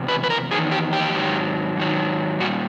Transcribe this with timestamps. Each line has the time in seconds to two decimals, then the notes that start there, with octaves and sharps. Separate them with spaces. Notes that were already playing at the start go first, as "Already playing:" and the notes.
Already playing: E2 C3
0.08 B4
0.24 B4
0.30 A#4
0.51 E2 C3 D#3 F#3 G#4
0.71 G4
0.93 G4
1.14 G#2 D#3 F#3
1.77 G#2 D#3 F#3
2.40 A#2 G3 F#4